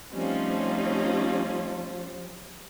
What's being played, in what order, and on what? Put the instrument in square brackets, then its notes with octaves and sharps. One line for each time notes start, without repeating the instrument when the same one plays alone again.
[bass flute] F3 [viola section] G3 C#4 F4 [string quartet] A3 C4 D#4